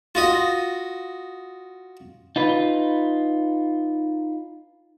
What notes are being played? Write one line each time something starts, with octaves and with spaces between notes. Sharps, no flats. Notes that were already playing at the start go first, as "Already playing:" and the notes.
F4 F#4 D#5
D#4 F4 B4